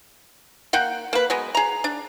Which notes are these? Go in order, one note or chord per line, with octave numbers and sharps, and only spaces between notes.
A#3 F#5 G5
A#3 B4
F#3 G#3 B3
G#4 A#5
D4